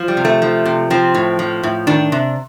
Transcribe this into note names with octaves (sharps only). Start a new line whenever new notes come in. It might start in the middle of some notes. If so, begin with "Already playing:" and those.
Already playing: F3
G3
C3
A3
F3
C3
F3 C4
A2
F3
A2
D#3 D4
C3